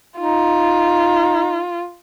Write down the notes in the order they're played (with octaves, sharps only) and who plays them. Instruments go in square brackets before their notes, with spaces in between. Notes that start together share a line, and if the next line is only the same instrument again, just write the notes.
[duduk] D#4 [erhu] F4